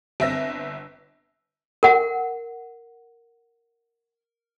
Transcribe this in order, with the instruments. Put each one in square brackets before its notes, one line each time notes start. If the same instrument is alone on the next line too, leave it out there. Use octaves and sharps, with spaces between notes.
[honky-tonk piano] G1 C4 E5 E6 A#6
[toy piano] A#4 F#5